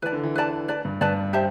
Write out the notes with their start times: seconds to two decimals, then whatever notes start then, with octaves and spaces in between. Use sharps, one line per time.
0.02 E3 B4 D5 A5
0.12 D3
0.24 E3
0.36 B4 D5 A5
0.68 B4 D5 A5
0.85 G2
1.01 G2 B4 D5 A5
1.33 G4 C5 E5 A5